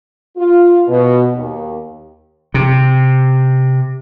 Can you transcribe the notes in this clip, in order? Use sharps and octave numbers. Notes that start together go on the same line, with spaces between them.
F4
B2
D#2
C3